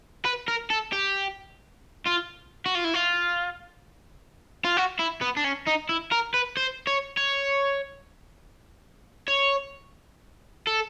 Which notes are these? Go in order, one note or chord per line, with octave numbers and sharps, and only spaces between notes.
B4
A#4
A4
G4
F4
F#4
F4
E4
F4
F4
F#4
E4
B3
D4
C#4
D#4
E4
A#4
B4
C5
C#5
C#5
C#5
A4